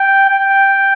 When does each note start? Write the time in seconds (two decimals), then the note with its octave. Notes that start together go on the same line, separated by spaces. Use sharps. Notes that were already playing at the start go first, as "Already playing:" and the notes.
Already playing: G5
0.30 G5